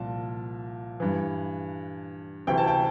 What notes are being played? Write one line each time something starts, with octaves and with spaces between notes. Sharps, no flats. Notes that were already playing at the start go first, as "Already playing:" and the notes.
Already playing: C2 A#2 F3 A5
G2 E3
D2 C3 E3 G5
A5
G5